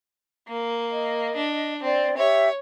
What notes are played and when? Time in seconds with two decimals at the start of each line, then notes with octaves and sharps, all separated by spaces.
0.48 A#3
0.90 D#5
1.36 D4
1.83 C4 D5
2.17 G4 C#5 E5